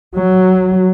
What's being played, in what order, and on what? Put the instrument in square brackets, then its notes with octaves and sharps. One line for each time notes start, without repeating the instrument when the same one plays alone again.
[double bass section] F#3